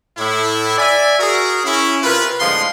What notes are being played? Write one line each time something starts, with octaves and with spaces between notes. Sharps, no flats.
A2 E4
D5 E5 G#5
F#4 G#4 A#4
C#4 E4
C3 F4 A#4 B4
A2 D3 F3 G#3 G#4 C6